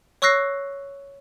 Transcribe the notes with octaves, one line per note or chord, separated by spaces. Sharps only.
C#5 C#6 E6 F#6 A#6 C7